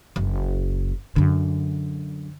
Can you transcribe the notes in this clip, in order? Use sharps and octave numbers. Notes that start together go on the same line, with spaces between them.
F#1
F#2 D3